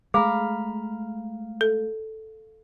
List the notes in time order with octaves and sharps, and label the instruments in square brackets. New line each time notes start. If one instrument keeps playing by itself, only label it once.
[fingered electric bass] G#3 A3 [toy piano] G#4 [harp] F5 A#5 B5
[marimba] A4